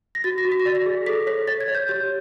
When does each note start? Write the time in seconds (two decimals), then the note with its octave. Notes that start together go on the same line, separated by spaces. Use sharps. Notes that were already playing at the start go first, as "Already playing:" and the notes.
0.15 A#6
0.24 F#4 A6
0.38 A#6
0.45 F#4
0.52 B6
0.60 A#6
0.66 D5 A6
0.75 A#6
0.86 G#4
1.06 A4 B6
1.27 C#5 B6
1.47 C#5 A6
1.61 G#6
1.68 C#5
1.75 G6
1.88 G4 G6